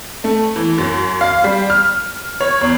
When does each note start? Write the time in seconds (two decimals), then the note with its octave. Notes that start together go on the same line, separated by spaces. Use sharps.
0.24 A3
0.56 E3
0.78 F#2
1.21 F5
1.44 G3
1.70 F6
2.41 C#5
2.61 E2